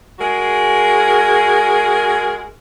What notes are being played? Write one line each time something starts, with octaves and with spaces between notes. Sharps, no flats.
G#3 F#4 G#4 A#4